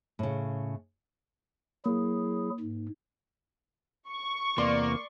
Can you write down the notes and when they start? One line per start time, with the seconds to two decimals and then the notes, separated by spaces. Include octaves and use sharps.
0.19 A2 C#3
1.86 F#3 A#3 E4 G#4
2.60 G#2
4.09 C#6
4.58 E2 C3 A#3 B3 D5 C6